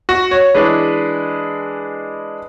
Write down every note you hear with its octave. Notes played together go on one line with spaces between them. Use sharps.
F#4
C#5
E3 G#3 D4 B4